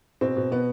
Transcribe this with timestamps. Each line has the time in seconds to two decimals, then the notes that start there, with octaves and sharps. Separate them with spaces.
0.21 B2 C4
0.37 B2
0.51 B2 B3